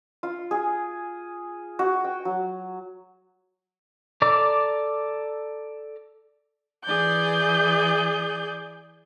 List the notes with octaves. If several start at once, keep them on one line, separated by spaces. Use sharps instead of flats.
F4
G#4
F#4
G5
F#3
A4 D5 A#5 D6
E3 G#4 D5 G6